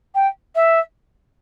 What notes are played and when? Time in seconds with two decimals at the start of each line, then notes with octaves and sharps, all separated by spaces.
0.14 G5
0.55 E5